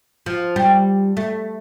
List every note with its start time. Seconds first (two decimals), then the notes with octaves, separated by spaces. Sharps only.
0.26 F3
0.56 G3
1.17 A3